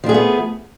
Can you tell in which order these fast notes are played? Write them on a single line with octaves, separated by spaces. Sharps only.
F3 D4 G#4 A3 B3